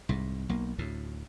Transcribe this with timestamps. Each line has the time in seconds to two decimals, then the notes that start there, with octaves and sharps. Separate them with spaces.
0.09 C2 G#2
0.49 B1 A#3
0.78 D2 A2